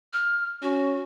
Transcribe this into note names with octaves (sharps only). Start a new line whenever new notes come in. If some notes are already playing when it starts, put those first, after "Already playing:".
F6
C#4 F#4